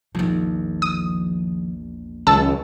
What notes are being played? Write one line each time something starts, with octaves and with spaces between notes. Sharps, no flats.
A#1 E2 D#3 F3
D#6
C#2 D3 D#3 F#3 A5 E6